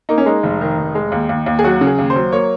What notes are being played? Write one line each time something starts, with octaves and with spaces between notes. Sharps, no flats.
A#3 D#4
C#4
G#3 D#4
F1
D#3
F1
G#3
D#2
D#2
D#2
G#4
F#3 F#4
C#3
G#4
D#2
C5
F#3
A#3 C#5